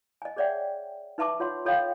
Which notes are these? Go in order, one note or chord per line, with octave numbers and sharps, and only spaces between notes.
D#5 G#5
G#4 C#5 D5 E5 F#5 G5
D#4 B4 E5 A5 C#6 D6
F4 C#5 F#5 C6
F4 A4 C#5 D#5 F5 G5